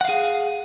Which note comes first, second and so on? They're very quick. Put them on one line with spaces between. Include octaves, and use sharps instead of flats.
F#5 F5 G#4